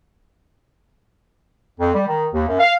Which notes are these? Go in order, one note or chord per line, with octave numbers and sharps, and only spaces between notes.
F2
G3
D#3
D#2
F#2
F5